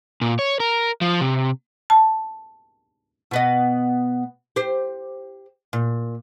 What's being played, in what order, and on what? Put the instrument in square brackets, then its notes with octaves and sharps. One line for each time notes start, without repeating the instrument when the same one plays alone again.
[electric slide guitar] A#2
C#5
A#4
F3
C3
[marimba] A5
[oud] B2 B3 D#5
G4 C5
A#2